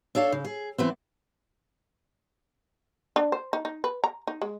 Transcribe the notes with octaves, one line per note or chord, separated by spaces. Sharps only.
D4 A4 C#5 F5
C#3
G#4
E3 B3 C4
D4
C5
D#4
D#4
B4
A#5
D#4
G#3